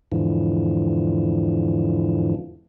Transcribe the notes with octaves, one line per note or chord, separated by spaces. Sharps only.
E2 G#2 D3 E3 F3